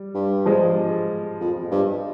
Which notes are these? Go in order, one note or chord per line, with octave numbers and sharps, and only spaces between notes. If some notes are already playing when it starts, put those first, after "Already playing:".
Already playing: G3
G2
F3 G#3
F2
G2